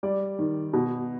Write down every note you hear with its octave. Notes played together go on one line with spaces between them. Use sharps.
G3 D5
D#3
B2